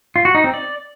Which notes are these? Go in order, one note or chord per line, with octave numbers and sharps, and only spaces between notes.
F4
F#4
D#4
C4
D5